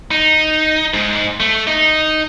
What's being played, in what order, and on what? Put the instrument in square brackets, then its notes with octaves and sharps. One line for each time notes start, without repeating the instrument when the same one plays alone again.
[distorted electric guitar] D#4
G#2
A3
D#4